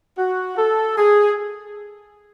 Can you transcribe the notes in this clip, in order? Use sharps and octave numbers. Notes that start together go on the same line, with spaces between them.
F#4
A4
G#4